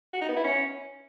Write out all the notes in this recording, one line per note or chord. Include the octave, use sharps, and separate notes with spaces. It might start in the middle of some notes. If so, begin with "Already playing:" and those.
F#4
D#4
B3
E4
C#4